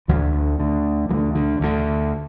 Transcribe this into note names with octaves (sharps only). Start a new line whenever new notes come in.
D2 D3 E3
D3
D2 D3
D2 D3 E3
D3
D2 D3